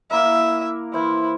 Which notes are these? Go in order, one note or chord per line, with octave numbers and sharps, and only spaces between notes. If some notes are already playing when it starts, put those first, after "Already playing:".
A#3 E4 A#4 E5
E3 E4 A#4 C5